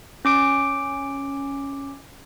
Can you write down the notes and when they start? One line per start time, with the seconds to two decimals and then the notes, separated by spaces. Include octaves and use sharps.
0.25 C#4 D6 D7